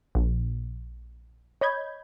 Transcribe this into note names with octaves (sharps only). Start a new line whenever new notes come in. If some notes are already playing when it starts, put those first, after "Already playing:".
A#1
C#5 D#5 B5 G6 G#6